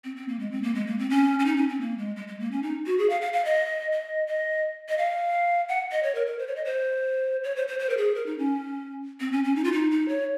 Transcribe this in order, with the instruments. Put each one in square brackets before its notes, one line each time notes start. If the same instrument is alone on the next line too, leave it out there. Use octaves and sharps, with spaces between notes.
[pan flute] C4
C4
A#3
G#3
C4
A#3
G#3
A#3
C4
C#4
C#4
D#4
C#4
C4
A#3
G#3
G#3
G#3
A#3
C#4
D#4
F#4
G#4
F5
F5
F5
D#5
D#5
D#5
D#5
F5
F#5
D#5
C#5
A#4
A#4
C5
C#5
D#5
C5
C#5
C5
C5
C5
A#4
G#4
A#4
D#4
C#4
C4
C#4
C#4
D#4
F4
D#4
D#4
C#5